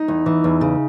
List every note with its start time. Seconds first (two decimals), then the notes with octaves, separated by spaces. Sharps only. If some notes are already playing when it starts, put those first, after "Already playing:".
Already playing: D#4
0.08 E2
0.26 E3
0.44 E2
0.61 C#3